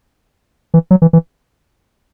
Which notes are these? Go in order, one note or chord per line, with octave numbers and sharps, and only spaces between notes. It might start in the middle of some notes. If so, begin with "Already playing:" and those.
E3
F#3
E3
E3